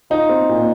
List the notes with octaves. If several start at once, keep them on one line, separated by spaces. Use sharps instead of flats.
D#4 F4
C4
A#2